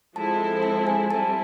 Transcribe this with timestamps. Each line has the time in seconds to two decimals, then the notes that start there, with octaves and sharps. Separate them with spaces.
0.15 F3 G#3 C4 E4 A4 A5
0.63 A5
0.87 G#5
1.10 G3 C4 E4 A5